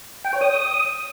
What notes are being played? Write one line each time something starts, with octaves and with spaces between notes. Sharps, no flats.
G5
C#5
D#6